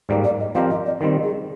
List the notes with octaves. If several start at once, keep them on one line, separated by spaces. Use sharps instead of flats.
G#2 G3 A#3 D5
D5
D#5
F3 C4 G4 A#4 F5
D#5
D5
D#3 G3 C4 D#5
G#4